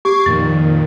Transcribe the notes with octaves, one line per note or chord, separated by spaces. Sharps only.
G4 C#6 D6 G#6 C7
F2 A#2 D#3 A6